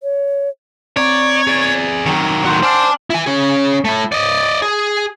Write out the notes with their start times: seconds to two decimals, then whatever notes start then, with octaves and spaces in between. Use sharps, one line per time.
0.03 C#5
0.97 C4 C#5 D5 A#5
1.47 G#4 D5
2.06 D#3 F#3
2.45 A2 F#4 F#5 C6 G6
2.63 D4 C5 G#5 E6 F6
3.10 E4 G#5
3.26 C#4 G#4
3.85 A3 E4
4.12 D5 D#5
4.62 G#4